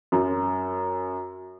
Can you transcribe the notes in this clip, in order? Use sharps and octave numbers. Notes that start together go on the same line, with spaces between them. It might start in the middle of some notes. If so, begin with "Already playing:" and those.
F#2